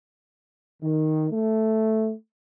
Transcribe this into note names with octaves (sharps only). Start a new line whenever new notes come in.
D#3
A3